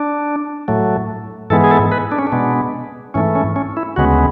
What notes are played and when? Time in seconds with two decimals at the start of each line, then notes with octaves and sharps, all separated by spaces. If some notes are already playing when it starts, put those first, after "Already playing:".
Already playing: D4
0.68 A2 F#3 A3
1.50 G#2 E3 G#3 B3 A4
1.64 G#4
1.71 A4
1.92 B4
2.12 D4
2.19 C#4
2.27 D4
2.32 B2 G#3 B3
3.14 G#2 E3 A3 C#4
3.35 C#4
3.56 C#4
3.77 E4
3.96 D2 C#3 G#3 B3 F#4